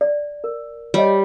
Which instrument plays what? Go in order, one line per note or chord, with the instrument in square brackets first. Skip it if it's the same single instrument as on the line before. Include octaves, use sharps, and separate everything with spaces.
[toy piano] D5
A#4
[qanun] G3 [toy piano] G4 C#5 D#5